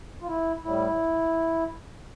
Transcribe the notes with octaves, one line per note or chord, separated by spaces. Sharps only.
F4
E4
A2 G3 E4